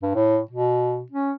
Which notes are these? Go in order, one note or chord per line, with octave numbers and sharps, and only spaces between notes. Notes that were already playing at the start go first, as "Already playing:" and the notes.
G2
A2
B2
C#4